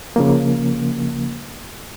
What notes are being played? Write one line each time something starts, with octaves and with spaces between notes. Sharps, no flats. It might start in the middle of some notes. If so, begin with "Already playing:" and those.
C#3 F3 A#3